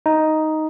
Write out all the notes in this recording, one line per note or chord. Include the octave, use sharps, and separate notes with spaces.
D#4